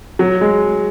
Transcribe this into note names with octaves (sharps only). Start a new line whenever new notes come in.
F#3
G#3